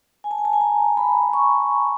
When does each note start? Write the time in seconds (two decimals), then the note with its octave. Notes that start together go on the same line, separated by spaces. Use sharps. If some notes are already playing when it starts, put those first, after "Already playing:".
0.24 G#5
0.31 A5
0.38 G#5
0.45 A5
0.53 G#5
0.61 A#5
0.97 B5
1.33 C#6